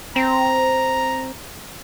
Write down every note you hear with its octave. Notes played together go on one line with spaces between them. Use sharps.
C4 A#5